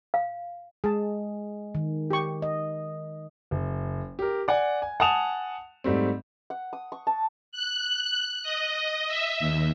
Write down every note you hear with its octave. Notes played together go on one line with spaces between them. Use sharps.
F5
G#3 G#4 A5
D#3
G4 C#6
D#5
F#1
G4 A#4
D5 F#5 G#5
G#5
F#5 G#5 A5 D#6 E7 F7
G#2 G3 A3 C4
F#5
D#6
C#6
A5
F#6
D#5
E5
D#2